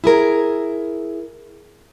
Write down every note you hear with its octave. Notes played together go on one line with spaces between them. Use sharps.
E4 G#4 A#4